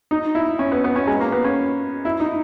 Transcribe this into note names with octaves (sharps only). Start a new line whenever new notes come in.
D#4
E4
C#4
B3
B3
C#4
G#3
A#3
B3
C#4
E4
D#4